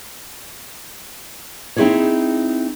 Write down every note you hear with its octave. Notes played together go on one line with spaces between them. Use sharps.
C4 D#4 E4 F#4 G#4 C#5